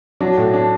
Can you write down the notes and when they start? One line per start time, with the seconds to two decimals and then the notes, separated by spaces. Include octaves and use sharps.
0.20 F#3 D4
0.37 A2
0.54 D4